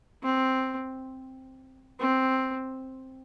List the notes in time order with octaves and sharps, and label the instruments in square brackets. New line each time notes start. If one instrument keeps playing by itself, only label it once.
[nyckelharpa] C4
C4